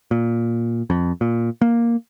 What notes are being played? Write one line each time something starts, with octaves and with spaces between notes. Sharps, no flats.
A#2
F2
A#2
A#3